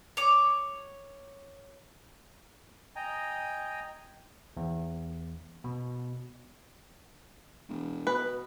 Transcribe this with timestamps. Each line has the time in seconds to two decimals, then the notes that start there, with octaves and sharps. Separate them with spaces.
0.17 C#5 D6
2.96 D#5 G5 G#5 A#5
4.57 E2
5.64 B2
7.69 E1
8.07 B2 B4